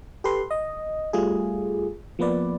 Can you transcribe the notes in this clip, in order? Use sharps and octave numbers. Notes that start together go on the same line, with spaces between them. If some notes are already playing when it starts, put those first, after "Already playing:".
G4 A4 B4 C6
D#5
G3 A3 F4 G#4
F3 A#3 B3 B4 D5